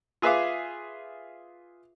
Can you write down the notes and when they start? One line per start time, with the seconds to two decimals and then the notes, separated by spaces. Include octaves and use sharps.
0.22 F4 G#4 B4 E5 F5 D6